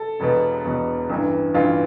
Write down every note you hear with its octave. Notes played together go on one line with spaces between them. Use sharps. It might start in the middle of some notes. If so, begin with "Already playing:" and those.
Already playing: A4
E1 E2 B2
E1 E2 B2
A1 G2 E3
A1 G2 E3 F4